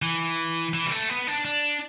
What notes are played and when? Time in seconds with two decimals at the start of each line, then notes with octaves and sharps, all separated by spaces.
0.02 E3
0.74 E3
0.86 G3
0.91 A3
1.09 B3
1.27 D4
1.45 D4